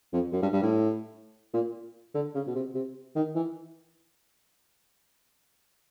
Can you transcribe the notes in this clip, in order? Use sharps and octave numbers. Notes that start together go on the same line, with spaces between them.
F2
F#2
G2
G2
A2
A#2
D3
C#3
B2
C3
C3
D#3
E3